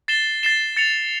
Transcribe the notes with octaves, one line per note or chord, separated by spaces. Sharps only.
A6 C7 E7 G7
A6 C7 E7 G7
A6 C#7 F7